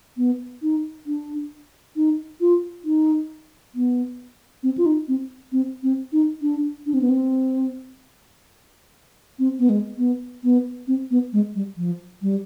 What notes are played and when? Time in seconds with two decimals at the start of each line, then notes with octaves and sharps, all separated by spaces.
0.17 B3
0.62 D#4
1.06 D4
1.96 D#4
2.41 F4
2.85 D#4
3.75 B3
4.63 C4
4.78 F4
4.86 D#4
5.08 C4
5.52 C4
5.83 C4
6.13 D#4
6.42 D4
6.86 D4
6.94 C4
7.01 B3
7.10 C4
9.39 C4
9.59 B3
9.69 G#3
9.98 B3
10.44 B3
10.88 C4
11.11 B3
11.33 G#3
11.55 G3
11.77 F3
12.22 G3